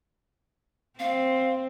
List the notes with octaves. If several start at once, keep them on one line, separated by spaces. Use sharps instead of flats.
C4 F5